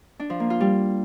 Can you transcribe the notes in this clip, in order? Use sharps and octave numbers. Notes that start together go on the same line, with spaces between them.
D4
F3
A#3
F4
G3